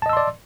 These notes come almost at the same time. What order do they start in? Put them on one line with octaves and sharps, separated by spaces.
A5 D#5 E6 C6 D5